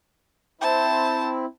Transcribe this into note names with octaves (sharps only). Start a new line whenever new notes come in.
C4 E4 C5 A5